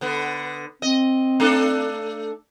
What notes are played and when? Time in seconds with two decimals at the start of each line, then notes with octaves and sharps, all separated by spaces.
0.01 D3 B3
0.82 C4 D#5
1.40 A3 D4 A4